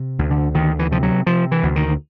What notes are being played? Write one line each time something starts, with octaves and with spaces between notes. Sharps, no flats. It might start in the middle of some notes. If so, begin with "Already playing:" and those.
Already playing: C3
D2
D3
D2 D#3
E3
C3 F3
F#3
C3 F3
E3
D2
D#3